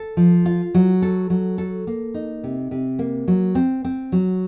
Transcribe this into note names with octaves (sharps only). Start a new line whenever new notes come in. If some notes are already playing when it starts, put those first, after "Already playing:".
Already playing: A4
F3
F4
F#3
A4
F#3
A4
A#3
D#4
C3
C3
A#3
F#3
C4
C4
F#3